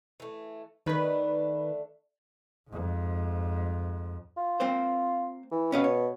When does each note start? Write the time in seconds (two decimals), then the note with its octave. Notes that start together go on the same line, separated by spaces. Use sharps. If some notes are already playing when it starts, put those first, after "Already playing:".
0.20 E3 A3
0.86 D#3 A3 D4 B4
2.69 F2 G#2
4.37 F4
4.60 A#3 C4 C5
5.52 E3
5.72 B2 C#4 B4 F5
5.84 C#5